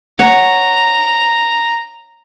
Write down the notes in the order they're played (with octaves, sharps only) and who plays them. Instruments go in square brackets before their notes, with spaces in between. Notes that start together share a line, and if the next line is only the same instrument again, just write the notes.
[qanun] C#5 F#5 [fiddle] A#5